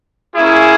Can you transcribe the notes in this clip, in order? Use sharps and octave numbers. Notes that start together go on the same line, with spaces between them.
A#3 C#4 E4 G#4